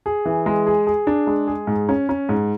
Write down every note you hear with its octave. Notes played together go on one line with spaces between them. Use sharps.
G#4
E3
G#3
G#4
G#4
D4
G#3
G#4
G#2
C#4
C#4
G#2